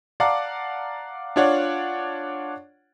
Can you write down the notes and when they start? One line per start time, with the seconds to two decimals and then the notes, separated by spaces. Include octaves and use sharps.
0.20 D5 F5 F#5 A5 A#5 D6
1.36 D4 F4 C#5 D5 F#5